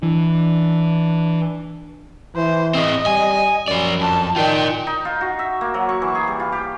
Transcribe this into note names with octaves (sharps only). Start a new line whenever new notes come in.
E3 D4
E3 C5
C4 G#4 D#5
G3 G#5
F#2 F3 D5
F2 A5
D#3 F4 D5 G5
D#4
F4
F#4
E5
A#3
F#3
C#6
E3
G#4
G3
F4
G4